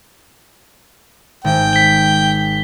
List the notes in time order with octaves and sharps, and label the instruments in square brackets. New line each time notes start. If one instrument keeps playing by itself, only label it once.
[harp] G#1 [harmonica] G5
[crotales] B6 G7